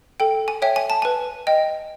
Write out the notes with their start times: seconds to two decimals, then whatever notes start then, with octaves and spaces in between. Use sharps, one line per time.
0.20 A4 G5
0.48 G#5
0.62 C#5 E5 G5
0.76 G#5
0.90 A5
1.02 B4 G#5
1.47 D#5 G5